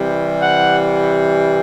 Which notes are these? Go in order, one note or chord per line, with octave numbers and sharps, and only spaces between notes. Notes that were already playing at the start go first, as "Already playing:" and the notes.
Already playing: C3 E3 G3
F#5